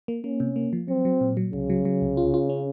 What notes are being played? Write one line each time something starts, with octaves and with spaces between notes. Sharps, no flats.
A#3
A#3 C#4
C3
A#3
F3
F#3 C4
F#3
A#2
F#3
C2 C#3
F#3
F#3
C2
F4
F4
C#4